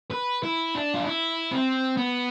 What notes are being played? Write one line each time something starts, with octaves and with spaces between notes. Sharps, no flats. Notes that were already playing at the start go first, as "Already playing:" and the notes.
B4
E4
D4
F4
E4
C4
B3